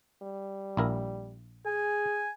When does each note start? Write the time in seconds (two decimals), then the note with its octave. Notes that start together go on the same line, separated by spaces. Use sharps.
0.22 G3
0.77 A#1 E4 A#4
1.66 G#4 G#5